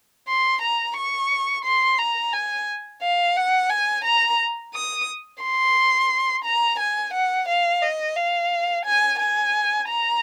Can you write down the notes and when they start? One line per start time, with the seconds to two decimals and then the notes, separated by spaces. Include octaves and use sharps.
0.28 C6
0.62 A#5
0.97 C#6
1.65 C6
1.98 A#5
2.33 G#5
3.02 F5
3.36 F#5
3.70 G#5
4.04 A#5
4.74 D#6
5.42 C6
6.44 A#5
6.79 G#5
7.14 F#5
7.48 F5
7.82 D#5
8.16 F5
8.85 G#5
9.19 G#5
9.88 A#5